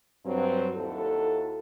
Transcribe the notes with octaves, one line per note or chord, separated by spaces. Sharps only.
G2 F#3 C4
D#2 E4 F#4 A4